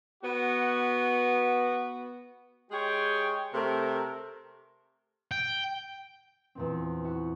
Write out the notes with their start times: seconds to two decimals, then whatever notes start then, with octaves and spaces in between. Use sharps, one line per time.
0.23 B3 F#4
2.71 G#3 G4 G#4 C#5 G5
3.53 C3 A3 C4 A#4
5.31 G5
6.55 E2 A#2 C4
7.04 E4 F#4 F#5